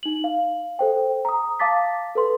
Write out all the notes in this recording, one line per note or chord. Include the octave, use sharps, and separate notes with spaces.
D#4 F#7
F5
A4 C5 G5
A#5 D#6
F5 A5 D6 A6 B6
A4 B4 C6